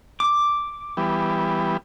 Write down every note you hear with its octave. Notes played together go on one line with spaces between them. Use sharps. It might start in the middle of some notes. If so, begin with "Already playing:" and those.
D6
E3 G3 B3